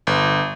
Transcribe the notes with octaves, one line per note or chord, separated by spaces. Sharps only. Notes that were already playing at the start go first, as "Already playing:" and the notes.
G1